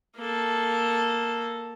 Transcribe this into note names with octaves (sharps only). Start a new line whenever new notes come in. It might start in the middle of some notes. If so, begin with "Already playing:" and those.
A#3 A4